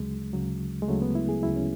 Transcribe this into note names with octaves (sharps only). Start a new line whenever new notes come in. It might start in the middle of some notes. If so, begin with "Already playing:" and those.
Already playing: D2 C#3 F#3 G#3
D2 C#3 F#3
G#3
D2 C#3 F#3 A3
B3
E4
G#4
D2 C#3 F#3 E4
C#4